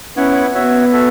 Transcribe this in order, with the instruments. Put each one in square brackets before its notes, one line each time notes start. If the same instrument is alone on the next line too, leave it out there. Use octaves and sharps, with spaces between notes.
[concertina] B3 E4 C#5 F#5 [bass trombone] C#4
[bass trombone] B3 [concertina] F#4 C#5 E5
[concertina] F#4 A4 E5